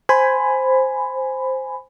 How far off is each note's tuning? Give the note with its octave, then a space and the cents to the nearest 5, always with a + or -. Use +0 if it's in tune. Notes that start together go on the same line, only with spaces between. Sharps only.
C5 +0 G#5 +0 B5 +15